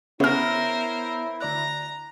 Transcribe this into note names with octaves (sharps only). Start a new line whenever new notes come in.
C#3 B3 E4 A#4 C5 C#5 E5 F6
D2 D5 A#5 F#6